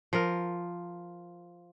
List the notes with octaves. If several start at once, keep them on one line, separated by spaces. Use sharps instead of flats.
F3 A#4